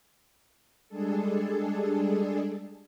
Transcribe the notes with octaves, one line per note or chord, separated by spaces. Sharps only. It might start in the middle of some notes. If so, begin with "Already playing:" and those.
G3 G#3 D4 G#4 A4